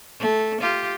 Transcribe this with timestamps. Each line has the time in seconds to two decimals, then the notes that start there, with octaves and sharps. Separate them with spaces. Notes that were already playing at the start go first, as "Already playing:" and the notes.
0.19 A3
0.60 F4 G4